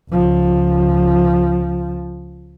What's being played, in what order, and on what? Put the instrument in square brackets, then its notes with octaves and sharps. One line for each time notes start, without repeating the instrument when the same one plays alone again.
[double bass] C#2 F3